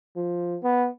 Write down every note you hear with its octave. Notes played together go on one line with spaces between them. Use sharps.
F3
B3